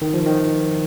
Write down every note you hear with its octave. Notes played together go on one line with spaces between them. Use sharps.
D#3
F3
D#3